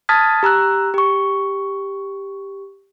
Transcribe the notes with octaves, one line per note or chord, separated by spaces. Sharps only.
A5 D#6 F6 G#6 A6 B6
G4 A#5 E6 F#6
G4 C#6